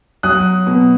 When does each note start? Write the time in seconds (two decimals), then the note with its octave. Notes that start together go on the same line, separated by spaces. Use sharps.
0.23 F#3 D#6 F#6
0.67 B2